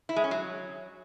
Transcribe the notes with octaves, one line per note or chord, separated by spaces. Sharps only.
E4
G#3
C#4
F#3